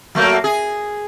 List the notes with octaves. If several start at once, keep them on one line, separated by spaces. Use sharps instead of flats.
F#3 A3 A#3
G#4